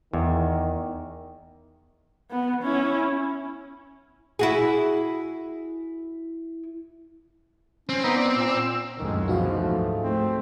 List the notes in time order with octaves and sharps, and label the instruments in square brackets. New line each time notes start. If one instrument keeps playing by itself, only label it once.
[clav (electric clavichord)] E2 [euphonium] D#3
[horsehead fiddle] B3
C#4 E4
[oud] E4 F#4 G#4
[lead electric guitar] C4 [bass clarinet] C#4
[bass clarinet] B3 [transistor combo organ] D#4 B4 A#5
[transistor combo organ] D5
[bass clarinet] A#2 [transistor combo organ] E6
[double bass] C#2 G#3 [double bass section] F#2 A#2 D3 [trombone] D#3
[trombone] B2 [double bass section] E3 F3 [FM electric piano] D#4 F#4 F5
[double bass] D2 G#2 [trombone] A3
[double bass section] A3 [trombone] C4